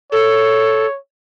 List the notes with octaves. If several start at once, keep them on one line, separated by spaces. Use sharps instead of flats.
A4 C#5